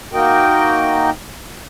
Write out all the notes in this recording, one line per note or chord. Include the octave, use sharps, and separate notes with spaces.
A#3 D#4 F#4 A#4 D#5 G5